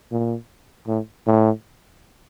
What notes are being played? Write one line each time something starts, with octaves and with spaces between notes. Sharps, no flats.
A#2
A2
A2